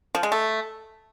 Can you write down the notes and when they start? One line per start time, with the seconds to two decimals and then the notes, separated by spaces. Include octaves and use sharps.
0.15 F3
0.23 G#3
0.32 A3